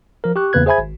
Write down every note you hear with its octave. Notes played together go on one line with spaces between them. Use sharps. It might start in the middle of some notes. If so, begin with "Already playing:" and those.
F3 A#4
G4 C#6 F#6
E2 C#3 A#3 B4 F#6 G#6
G#4 C5 E5 G#5 B5 G#6
G#1